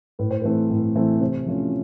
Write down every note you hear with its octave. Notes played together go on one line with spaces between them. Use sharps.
A2 B4
C5
E3 A3 C4 B4
A2
E3 A3 C4
C3 C5
F3 A3 C#4